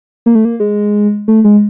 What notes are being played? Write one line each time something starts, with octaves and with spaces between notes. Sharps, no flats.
A#3
A3
A#3
G#3
A3
G#3